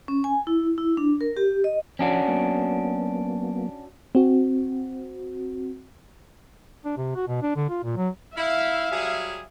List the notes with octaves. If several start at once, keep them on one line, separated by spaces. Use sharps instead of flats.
C#4
G#5
E4
E4
D4
A#4
G4
D#5
F3 C#4 D4 F#4
F#3 A#3 B3
C4 F#4
D4
C3
F#4
B2
D4
D3
F4
A#2
F#3
E4 E5 F5
F#3 G3 G#4